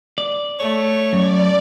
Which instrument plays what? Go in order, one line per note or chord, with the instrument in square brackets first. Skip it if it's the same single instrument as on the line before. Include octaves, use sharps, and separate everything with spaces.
[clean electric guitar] D5
[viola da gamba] A3 [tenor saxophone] C#5
[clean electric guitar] F#2 [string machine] D5